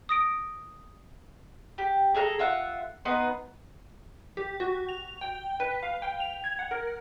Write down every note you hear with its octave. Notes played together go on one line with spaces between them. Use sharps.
D#6 A#6 D7
G4
G#4 A4 F5 A#5
F4 E5 F#5
B3 D#4 B4 C6
G4
F#4
F7
G5
B4
F5
G5
F7
G#6
F#5
A#4